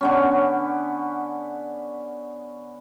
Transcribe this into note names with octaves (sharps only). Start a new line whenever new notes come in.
D3 B3 C#4